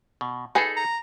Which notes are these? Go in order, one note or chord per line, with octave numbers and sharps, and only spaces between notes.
B2
D#4 G#4 A4 B4 G#5
A#5